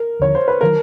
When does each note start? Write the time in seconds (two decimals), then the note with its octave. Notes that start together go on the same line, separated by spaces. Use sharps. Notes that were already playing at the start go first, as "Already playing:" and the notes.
Already playing: A#4
0.20 D#2 D3 F3 C#5
0.35 C5
0.48 B4
0.61 D#3 F#3 A#4